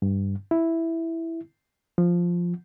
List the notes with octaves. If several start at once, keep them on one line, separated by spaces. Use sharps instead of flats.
G2
E4
F3